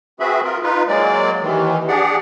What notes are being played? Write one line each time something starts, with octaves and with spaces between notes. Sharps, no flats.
C4 F#4 G#4 B4 E5 B5
F4 A#4
D#4 F4 B4
F#3 G#3 A#3 D5
D#2 D#3 E3
D4 G4 G#4 D5 F#5